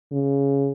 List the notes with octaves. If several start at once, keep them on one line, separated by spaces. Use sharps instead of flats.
C#3